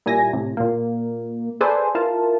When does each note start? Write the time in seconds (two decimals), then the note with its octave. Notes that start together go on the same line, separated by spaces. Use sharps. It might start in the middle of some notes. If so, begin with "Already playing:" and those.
0.06 A#2 G3 E4 G#5 A#6
0.33 A2 C3
0.57 A#2 A#3
1.61 G#4 A4 B4 C5 D5 G#5
1.95 E4 F4 A#4 A5